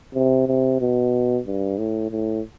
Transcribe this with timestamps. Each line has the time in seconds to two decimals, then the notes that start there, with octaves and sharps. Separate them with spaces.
0.15 C3
0.47 C3
0.80 B2
1.46 G2
1.78 A2
2.11 A2